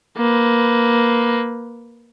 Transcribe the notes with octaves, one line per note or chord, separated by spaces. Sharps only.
A#3 B4